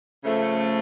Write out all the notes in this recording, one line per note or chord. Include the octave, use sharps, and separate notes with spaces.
C#3 F3 A3